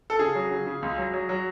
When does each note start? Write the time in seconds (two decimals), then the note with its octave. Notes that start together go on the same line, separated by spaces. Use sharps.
0.10 A4
0.19 C#3 G#4
0.35 F#3
0.51 C#3
0.66 C#3
0.82 C#2
0.98 F#3
1.14 F#3
1.29 F#3